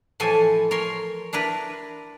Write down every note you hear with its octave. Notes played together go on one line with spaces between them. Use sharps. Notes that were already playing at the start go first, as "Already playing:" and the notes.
A2 E3 F3 A4 G#5
A#4 C#5 C6
D4 E4 A#4 B4